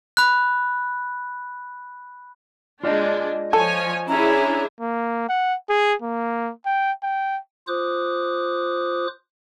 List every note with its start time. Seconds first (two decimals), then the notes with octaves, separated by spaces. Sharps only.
0.17 B5 F#6
2.83 G#3 D4 F4 D5 D#5
3.53 F3 A4 C#5 G#5
4.08 C#4 D4 E4 G#4 C#5 A#5
4.81 A#3
5.29 F#5
5.69 G#4
6.02 A#3
6.66 G5
7.03 G5
7.67 F4 C5 D6 D#6 F#6